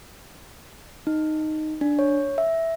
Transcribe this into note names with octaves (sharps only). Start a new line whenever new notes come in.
D#4
D4
C#5
E5